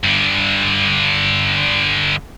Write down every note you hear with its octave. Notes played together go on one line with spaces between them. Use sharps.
G2 D3